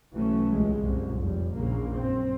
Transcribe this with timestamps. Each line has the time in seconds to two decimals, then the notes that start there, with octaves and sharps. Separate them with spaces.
0.15 B1 E3 F#3 A3 C#4
0.51 C#2 B2 G3 G#3
0.81 C2 F#2 A#2
1.20 F1 F2 G3
1.55 A#1 E2 C#3 A#3
1.94 F#2 C4